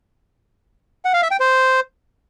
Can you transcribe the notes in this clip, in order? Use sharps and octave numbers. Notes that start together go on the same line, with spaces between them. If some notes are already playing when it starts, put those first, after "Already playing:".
F#5
F5
E5
G5
C5